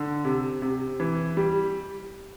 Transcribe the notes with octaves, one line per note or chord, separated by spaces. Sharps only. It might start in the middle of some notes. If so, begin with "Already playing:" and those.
Already playing: D3
C3
C3
E3
G3